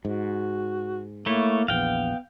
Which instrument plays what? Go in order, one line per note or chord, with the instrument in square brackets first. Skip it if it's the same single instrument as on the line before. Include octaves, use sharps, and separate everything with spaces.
[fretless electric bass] G#2 [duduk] F#4
[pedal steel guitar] A3 E4 C#5 [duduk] A#3
[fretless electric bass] A#1 E2 [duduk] B3 [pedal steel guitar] F5 G5